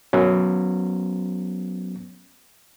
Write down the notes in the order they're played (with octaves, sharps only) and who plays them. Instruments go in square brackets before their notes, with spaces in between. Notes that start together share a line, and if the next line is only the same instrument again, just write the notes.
[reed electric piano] F#3 B3 C#4